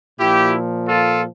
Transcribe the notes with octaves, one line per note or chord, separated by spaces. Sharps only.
A#2 F3 E4 G4
F4 A4